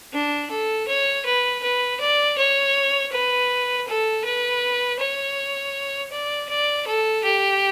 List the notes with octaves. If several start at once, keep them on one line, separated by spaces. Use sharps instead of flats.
D4
A4
C#5
B4
B4
D5
C#5
B4
A4
B4
C#5
D5
D5
A4
G4